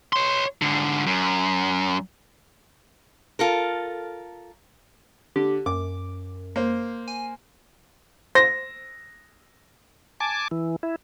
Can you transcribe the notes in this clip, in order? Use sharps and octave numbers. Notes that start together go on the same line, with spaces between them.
C#5 C6
G#2 D3
F#2
F4 A4 A#4
D3 G4
F#2 D6
A#3 C5
G#5
C5 A#6
G#5 A5 D6
E3
E4